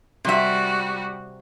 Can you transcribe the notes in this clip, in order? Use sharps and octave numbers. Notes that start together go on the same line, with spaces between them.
C3 G3 F#4 E5